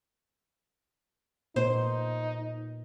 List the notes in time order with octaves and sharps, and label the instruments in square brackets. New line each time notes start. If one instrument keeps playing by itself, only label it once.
[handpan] A#2 B3 [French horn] D#4 [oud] C5